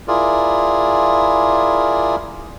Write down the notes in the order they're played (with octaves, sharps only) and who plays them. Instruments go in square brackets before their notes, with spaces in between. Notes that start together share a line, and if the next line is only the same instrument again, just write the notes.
[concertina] E4 F4 G#4 A#4 D5